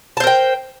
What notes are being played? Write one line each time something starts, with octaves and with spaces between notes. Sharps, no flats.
A#4 C5 G5 A5